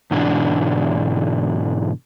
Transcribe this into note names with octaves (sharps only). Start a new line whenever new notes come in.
G#2 B2 D3 E3 D4